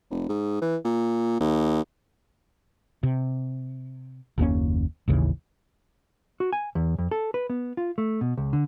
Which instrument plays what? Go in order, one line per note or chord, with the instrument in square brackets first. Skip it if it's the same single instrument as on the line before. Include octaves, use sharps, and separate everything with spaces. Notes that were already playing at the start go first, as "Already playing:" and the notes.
[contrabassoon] F1
G#2
E3
A#2
D#2
[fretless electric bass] C3
F#1 D#2 A#3 C#4
A1 D#2 C#3 E3
[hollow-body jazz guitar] F#4
G#5
E2
F2
A4
B4
B3
F4
A3
B2
C#2
D3